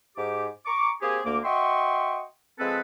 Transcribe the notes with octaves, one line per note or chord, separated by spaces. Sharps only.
G#2 G4 D6
A#5 C#6 D6
A#3 C4 G4 G#4
D2 A#3 D6
F#4 D#5 E5 G5 C6 C#6
F3 G#3 C4 G#4 A4 B4